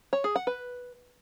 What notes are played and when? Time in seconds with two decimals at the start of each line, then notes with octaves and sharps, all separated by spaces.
0.13 C#5
0.24 G#4
0.36 F#5
0.47 B4